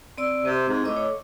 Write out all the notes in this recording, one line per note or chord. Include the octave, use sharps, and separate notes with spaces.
C4 D5 E6
C3 C4
G#2
A2 D#5 D6
C#5